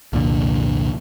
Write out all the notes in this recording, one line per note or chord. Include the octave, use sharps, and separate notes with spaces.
C2 F2 A#2 D3